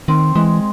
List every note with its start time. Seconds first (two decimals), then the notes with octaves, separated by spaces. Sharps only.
0.08 D#3 C4
0.35 E3 G#3